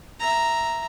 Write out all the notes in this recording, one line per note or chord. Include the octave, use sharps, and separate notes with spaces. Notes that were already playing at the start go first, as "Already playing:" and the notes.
E5 A#5